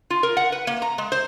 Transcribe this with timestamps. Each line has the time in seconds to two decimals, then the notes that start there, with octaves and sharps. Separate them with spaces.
0.10 F4
0.23 A#4
0.37 F#5
0.52 B4
0.67 A#3
0.82 A#5
0.98 G#3
1.12 C5